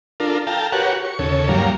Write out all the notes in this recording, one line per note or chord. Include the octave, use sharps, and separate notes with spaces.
D4 F4 A4 A#4
A4 F5 G5 A5 A#5
F#4 G4 A#4 B4 C#5 F#5
C#6
D#2 C#3 A4 C#5
G2 F#3 G3 A#3 F5 A#5